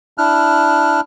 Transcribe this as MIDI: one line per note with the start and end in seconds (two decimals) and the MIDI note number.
0.18 1.01 62
0.18 1.01 64
0.18 1.01 89
0.18 1.01 90